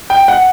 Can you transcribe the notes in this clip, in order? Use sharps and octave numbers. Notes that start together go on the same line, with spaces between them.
G5
F#5